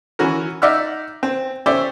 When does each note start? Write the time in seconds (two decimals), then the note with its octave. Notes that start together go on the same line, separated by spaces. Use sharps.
0.19 E3 C#4 F#4 A#4
0.62 D#4 D5 E5 F#5 E6 F6
1.23 C4
1.66 C#4 G4 C5 D5 E5